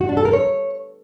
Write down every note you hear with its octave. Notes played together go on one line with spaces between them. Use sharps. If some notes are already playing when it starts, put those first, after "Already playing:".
F#4
D4
A4
A#4
C#5